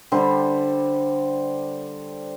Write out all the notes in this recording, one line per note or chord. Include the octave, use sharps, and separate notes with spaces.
D3 G3 C5